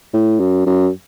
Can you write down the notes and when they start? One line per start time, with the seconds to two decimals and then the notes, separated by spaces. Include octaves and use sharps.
0.13 A2
0.40 F#2
0.66 F#2